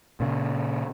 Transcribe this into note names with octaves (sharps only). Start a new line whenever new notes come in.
A#2 C#3